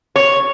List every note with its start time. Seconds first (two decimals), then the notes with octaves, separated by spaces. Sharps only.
0.16 C#5